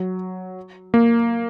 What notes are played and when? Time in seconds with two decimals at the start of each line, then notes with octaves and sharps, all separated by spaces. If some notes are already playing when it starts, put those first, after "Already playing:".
Already playing: F#3
0.94 A#3